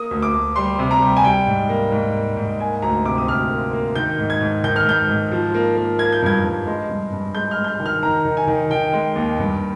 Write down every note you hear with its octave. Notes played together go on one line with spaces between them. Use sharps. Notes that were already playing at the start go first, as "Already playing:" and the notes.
Already playing: A#3 D#6
D2
D6
D2
G3 C6
C3
A#5
G3
G#5
G3 G5
G#2
A#3
G#2
A#3
G#2
A#3 G#5
D2 A#5
C3 D6
D#6
D2 F6
A#3
A#3
D#3 G6
G#2
G#6
G#2
D#3 G6
F6
G#2 G6
G#2
F3
A#3
A#3
A#3 G#6
G6
G2 G#6
G2
G#3
G2
G2
G#3 G6
F6
G#3
G6
F6
D#3
F6
D#3 A#5
D#3
G#5
D#3
D#3 G5
G#3
D#2
G2